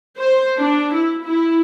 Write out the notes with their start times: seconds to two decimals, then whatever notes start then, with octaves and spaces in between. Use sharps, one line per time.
0.19 C5
0.58 D4
0.94 E4
1.24 E4